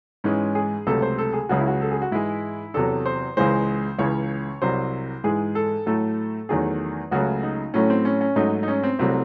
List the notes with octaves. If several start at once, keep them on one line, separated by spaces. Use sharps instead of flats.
G#2 E3 G#3 C#4
G#4
C#2 C3 F#3 A3 A4
C5
A4
G#4
C#2 C#3 F#3 F#4
E4
F#4
A4
G#4
F#4
G#2 E3 G#3 E4
E2 C3 F#3 A4
C5
C#2 C#3 E3 G#3 C5
C#2 C#3 E3 C#5
C2 C3 F#3 C5
G#2 E3 G#3 G#4
A4
A2 F#3 A3 A4
E2 D#3 F#3 A3 G#4
C#2 C#3 F#3 A3 F#4
D#4
A2 F#3 A3 C#4
C4
C#4
C#4
G#2 F#3 A3 D#4
D#4
C#4
C4
C2 C3 F#3 A3 C4